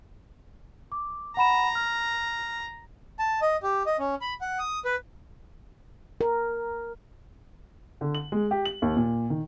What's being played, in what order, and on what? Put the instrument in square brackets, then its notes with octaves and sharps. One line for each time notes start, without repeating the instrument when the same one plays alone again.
[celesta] D6
[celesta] F#5 B5 E7 [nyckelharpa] A#5
[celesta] F6
[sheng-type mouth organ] A5
D#5
G4
D#5
C#4
B5
F#5
D#6
B4
[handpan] A#4
[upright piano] D3
F#7
G#3
G4
F#7
D#2
A#2
D#3